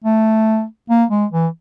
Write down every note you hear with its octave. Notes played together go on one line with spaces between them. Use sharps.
A3
A#3
G#3
E3